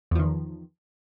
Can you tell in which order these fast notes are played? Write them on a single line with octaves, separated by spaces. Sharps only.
E2 F3 D#3